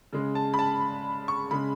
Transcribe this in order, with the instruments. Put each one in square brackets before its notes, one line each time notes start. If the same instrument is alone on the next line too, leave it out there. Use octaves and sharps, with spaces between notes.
[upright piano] C#3 G#3
A5
B5
A5
C#6
C#3 G#3 B5